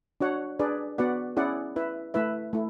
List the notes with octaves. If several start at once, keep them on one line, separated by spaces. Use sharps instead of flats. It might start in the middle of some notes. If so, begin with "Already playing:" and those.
D4 F#4 C#5 F#5
D4 G#4 B4 D5
B3 F#4 B4 D5 F#5
C#4 E4 G#4 D5 F#5
E4 B4 E5
A3 E4 B4 E5
A3 E4